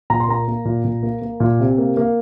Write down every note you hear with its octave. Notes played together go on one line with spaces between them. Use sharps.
A#2 A#5
C6
A#3 A#5
A#3
A#2
A#2
A#3
A#3
A#2
C3
A#3
A#3